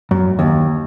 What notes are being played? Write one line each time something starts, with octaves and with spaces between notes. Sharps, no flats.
F#2
D#2